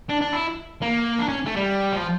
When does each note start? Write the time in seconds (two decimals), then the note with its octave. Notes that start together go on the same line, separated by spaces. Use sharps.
0.09 D4
0.21 D4
0.32 E4
0.82 A#3
1.19 D4
1.28 C#4
1.46 A3
1.56 G3
1.92 F3